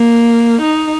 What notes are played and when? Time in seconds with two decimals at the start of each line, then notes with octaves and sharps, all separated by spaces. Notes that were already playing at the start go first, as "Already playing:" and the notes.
Already playing: A#3
0.62 D#4